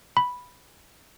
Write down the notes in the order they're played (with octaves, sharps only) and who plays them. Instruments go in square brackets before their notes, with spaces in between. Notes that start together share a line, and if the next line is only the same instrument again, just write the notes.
[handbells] B5